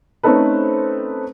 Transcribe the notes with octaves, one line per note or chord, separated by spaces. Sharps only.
A3 C4 C#4 D#4 A4 B4